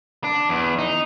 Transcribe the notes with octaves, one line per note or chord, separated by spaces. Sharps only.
D4
E2
D#4